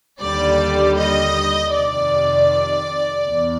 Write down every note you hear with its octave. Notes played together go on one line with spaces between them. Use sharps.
D#2 D3 G3 D5
D#5
F2 C3 D#3 D5
E2